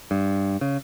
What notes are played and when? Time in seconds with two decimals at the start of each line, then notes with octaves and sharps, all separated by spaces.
0.11 G2
0.61 C#3